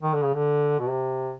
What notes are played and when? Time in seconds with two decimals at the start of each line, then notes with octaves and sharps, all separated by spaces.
0.03 D#3
0.14 D3
0.23 C#3
0.34 D3
0.79 B2
0.89 C3